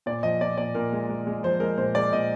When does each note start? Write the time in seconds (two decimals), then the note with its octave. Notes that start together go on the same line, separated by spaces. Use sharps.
0.06 A#2 D5
0.23 F3 D#5
0.41 A#2 D5
0.58 A#2 D5
0.75 A#2 A#4
0.92 G#3
1.09 G#3
1.27 G#3
1.43 F3 C5
1.60 G#3 A#4
1.78 A#2 C5
1.95 G#3 D5
2.13 A#2 D#5